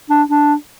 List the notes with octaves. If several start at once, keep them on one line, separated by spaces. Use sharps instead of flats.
D4
D4